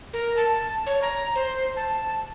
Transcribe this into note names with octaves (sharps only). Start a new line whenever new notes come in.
A#4
A5
C#5
A#5
C5
A5